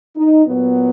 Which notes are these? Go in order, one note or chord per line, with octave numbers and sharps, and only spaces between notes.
D#4
A#2 F#3 B3